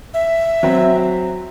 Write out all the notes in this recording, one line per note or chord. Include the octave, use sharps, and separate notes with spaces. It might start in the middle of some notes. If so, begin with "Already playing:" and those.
E5
F#3 C4